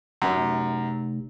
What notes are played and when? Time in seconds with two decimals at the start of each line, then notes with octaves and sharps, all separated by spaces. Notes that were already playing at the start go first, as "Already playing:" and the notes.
0.22 F1 F#2